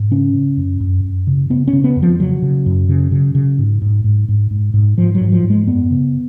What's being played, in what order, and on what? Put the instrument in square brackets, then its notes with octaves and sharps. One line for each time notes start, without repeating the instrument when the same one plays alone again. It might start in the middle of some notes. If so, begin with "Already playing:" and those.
Already playing: [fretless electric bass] G#2
C#3 C#4
C#3
F#2
F#2
F#2
C#3
C#3 B3
C#4
C#3
B3
F2
F3
C#3 F#3
C#3
F#2
C#3
C#3
C#3
G#2
G#2
G#2
G#2
G#2
G#2
G#2 F3
F#3
G#2
F3
G#2
G#3
F#2 B3
C#3